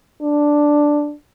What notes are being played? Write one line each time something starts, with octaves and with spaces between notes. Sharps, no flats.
D4